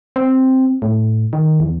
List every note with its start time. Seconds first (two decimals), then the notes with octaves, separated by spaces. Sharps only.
0.16 C4
0.82 A2
1.33 D#3
1.60 E2